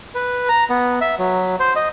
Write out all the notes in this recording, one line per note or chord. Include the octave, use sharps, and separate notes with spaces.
B4
A#5
B3
E5
F#3
C5
D#5